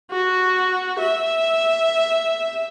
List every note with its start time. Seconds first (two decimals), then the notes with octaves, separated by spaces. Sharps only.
0.11 F#4
0.99 E5